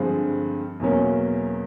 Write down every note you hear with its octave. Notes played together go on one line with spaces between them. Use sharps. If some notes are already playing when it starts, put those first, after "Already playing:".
Already playing: G2 D3 F3 G#3 C4
E2 B2 F#3 A#3 C#4